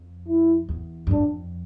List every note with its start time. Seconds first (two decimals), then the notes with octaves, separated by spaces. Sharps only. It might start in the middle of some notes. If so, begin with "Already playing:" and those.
Already playing: F2
0.28 E4
0.69 E2
1.07 G2
1.11 F2 D4